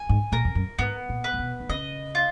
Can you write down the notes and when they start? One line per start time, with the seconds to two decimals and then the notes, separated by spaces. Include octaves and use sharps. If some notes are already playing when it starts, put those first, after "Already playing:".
Already playing: G#5
0.09 G#2
0.32 A#2 A#4
0.45 F2
0.55 F#2
0.79 G#2 B3
1.09 A#2
1.24 B4
1.34 A#2
1.39 B2
1.60 D#3
1.69 C#3 D#5
2.15 F4